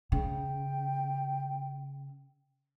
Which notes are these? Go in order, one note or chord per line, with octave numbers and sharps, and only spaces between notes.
C#3 G5